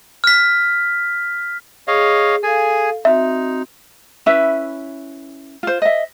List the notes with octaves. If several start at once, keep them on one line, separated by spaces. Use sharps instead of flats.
F6 B6
G#4 C#5 D#5 F5
G#4 A4 F5 G#5
C4 D#4 F#4 E5
C#4 E4 B4 E5
F4 C5
D#5 E5